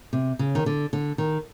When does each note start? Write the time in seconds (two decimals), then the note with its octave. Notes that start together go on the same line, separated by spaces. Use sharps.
0.13 C3
0.39 C#3
0.55 D#3
0.66 D3
0.93 D3
1.18 D#3